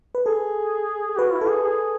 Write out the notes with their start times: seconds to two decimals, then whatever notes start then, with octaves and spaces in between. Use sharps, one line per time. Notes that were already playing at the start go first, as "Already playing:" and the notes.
0.15 B4
0.26 G#4 A4
1.10 G#4
1.18 F#4 B4
1.34 E4
1.41 A4
1.49 G#4
1.64 G#4